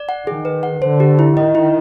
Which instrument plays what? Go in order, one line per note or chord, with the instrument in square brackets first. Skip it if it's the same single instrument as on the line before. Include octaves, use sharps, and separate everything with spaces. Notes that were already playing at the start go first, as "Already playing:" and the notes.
Already playing: [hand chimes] D5
F#5
[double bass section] D#3 [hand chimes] G#4
[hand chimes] B4
F#5
[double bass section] D3 [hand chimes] C5
[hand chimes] G4
E4
[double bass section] D#3 [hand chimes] D#5
[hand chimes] E4